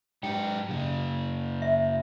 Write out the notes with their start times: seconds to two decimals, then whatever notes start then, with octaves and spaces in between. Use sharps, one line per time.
0.23 G#2 G4 G5
0.69 F#2 C#3
1.62 E5